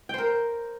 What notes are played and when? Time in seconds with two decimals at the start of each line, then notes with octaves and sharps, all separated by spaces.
0.09 G5
0.14 C5
0.18 A#4